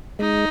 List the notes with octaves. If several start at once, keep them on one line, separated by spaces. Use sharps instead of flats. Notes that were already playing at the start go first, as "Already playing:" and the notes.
G#3 D#4